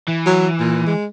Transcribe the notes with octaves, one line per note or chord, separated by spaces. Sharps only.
E3
F#3
A#2
G#3